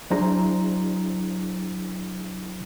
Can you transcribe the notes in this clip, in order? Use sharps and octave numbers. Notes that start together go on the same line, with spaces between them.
F#3 D4 E4 G#4 C5 A#5